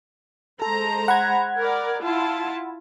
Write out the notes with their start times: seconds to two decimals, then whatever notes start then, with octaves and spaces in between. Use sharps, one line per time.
0.62 G#3 A4 C5 A#5
1.08 F#5 B5 G#6
1.58 A#4 D5
2.02 E4 F4 A5